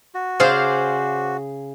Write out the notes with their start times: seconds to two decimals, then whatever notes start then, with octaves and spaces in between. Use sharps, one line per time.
0.15 F#4
0.40 C#3 G#4 C5 D5 F5